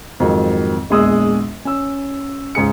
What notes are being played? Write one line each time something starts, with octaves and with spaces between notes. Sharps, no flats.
F2 G#2 D#3 F#3
A#1 E2 G#3 D#6 E6
C#4 E6
C#2 G#2 G#4 C#7